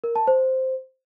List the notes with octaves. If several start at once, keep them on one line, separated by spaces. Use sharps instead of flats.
A#4
A5
C5